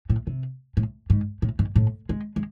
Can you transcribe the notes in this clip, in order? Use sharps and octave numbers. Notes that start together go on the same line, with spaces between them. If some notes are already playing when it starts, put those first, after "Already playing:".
A2
C3
A2
G#2
A2
G#2
A2
G#3
G#3